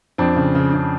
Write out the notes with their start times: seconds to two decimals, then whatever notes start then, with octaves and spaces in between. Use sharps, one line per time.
0.18 F2 C4 D4
0.36 C#3
0.55 C#3
0.74 C#3